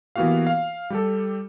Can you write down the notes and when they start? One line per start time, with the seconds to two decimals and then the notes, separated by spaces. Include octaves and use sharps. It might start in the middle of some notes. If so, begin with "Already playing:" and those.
0.16 E3 A#3 B3 F#4 G4 F5
0.47 F5
0.90 G3 G4 A4